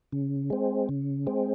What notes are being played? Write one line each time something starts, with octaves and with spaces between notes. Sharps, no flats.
C#3
G#3 C4
C#3
G#3 C4